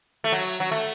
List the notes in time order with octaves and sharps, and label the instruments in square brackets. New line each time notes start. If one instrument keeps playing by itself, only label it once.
[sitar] A3
F#3
F#3
A3